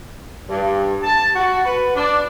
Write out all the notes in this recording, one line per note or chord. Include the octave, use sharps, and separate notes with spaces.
G2
A5
F#4
B4
D4